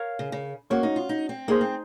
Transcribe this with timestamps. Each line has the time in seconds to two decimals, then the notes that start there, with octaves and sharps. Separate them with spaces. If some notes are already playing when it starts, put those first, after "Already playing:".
Already playing: A#4 C#5 F5
0.19 C#3
0.32 C#3
0.70 A#3 C#4 F#4 C#5
0.83 D#4
0.96 F4
1.09 D#4
1.29 C4
1.48 A#3 D#4 G#4 C5
1.61 C4